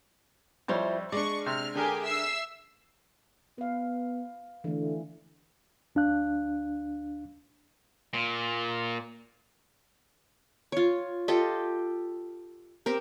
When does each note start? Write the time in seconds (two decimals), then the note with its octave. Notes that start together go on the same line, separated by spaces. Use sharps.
0.68 F2 G3 E4 F4 C5 C#5
1.12 G#3 D4 D5 C#6
1.46 C3 F6
1.75 D3 G4 G#4 A#4 G#5
2.05 E5 E6 C7
3.58 B3 B4 F5
4.64 D3 E3 A3
5.95 D2 D4 F5 F#6
8.13 A#2
10.72 F4 C#5
11.28 F4 G4 A4 D#5
12.86 C4 G4 A#4